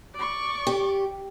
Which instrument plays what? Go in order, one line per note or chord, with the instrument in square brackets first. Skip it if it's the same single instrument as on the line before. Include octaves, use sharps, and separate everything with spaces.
[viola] D5 C#6
[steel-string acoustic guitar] G4